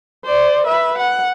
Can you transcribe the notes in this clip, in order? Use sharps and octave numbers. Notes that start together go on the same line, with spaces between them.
C5 D5
B4 E5
F#5